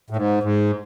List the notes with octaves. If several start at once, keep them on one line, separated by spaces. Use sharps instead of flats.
A2
G#2
G#2